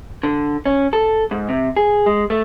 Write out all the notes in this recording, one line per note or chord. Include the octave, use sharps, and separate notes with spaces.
D3
C#4
A4
G#2
C3
G#4
G#3
A3